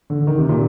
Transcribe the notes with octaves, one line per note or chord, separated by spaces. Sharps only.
D3
D#3
C3
A#2